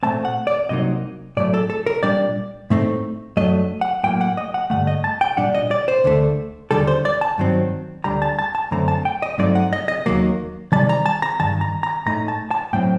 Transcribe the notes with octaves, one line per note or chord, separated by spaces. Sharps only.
A#2 F#3 A3 C4 A5
F#5
D5
C2 C3 F#3 A#3 D#4 D#5
A2 F#3 A3 D5
A4
A4
A#4
A#2 G3 D4 D5
A2 A3 C4 D#4
F#2 F#3 A3 D4 D#5
F#5
A2 F#3 A#3 G5
F#5
D#5
F#5
G2 D3 A3 F#5
D#5
A5
G5
A#2 G3 D4 F#5
D#5
D5
C5
D2 D3 A3
D#2 D3 G3 A4
C5
D5
A5
G2 D#3 F#3 C4
D2 D3 G3 A#5
A5
A5
A5
F#2 D3 A3 C4 A#5
A5
G5
D#5
G2 F#3 A3 C4 D#4 D5
F#5
D#5
D#5
D#2 D#3 F#3 A#3
C3 D#3 G3 A5
A#5
A5
A#5
G2 D#3 A5
A#5
A#5
A2 A3 D#4 A#5
A5
A5
A2 F#3 C4 G5